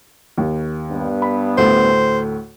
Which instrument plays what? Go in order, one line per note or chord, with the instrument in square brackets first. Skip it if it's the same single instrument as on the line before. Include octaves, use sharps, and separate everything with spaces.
[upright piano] D#2
[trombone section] G2 B3
[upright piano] B5
[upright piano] D2 A2 A3 [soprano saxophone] C5